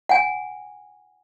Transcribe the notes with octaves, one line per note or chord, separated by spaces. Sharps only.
F#5 G#5